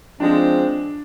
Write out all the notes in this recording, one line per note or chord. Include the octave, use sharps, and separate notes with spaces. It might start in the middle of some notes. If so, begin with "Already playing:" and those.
F3 G#3 C4 D4